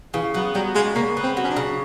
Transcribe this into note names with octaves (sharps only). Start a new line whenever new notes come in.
C#3 E3
F#3 B3
F#3 G3
C#3 G#3
C#3 A#3
B3
C4
F#3
C#4
D4
C#3